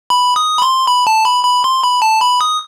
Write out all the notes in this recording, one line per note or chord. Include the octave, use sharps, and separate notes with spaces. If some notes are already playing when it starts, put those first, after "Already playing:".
B5
D#6
B5
C6
B5
A5
B5
B5
C6
B5
A5
B5
D#6